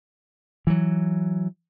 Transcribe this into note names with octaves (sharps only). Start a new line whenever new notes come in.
E3 F#3